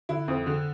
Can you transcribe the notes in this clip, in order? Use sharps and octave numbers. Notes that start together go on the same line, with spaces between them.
D3 E4
F2
D3